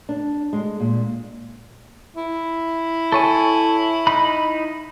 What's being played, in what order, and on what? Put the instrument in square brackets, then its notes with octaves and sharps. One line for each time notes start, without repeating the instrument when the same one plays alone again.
[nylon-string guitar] D4
G#3
A#2
[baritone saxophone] E4
[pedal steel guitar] A4 C#5 G#5
D#4 B5